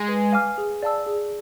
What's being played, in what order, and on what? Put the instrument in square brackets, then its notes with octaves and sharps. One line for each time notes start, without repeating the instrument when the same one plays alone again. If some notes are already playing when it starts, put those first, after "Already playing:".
Already playing: [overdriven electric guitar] G#3
[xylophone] B4
F5 G#5 D6 F6
G#4
D5 F5 A5 E6
G#4